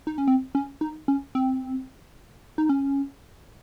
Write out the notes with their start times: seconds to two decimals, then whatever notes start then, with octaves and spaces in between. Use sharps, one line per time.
0.07 D#4
0.18 C#4
0.28 C4
0.55 C#4
0.81 D#4
1.08 C#4
1.35 C4
2.58 D#4
2.69 C#4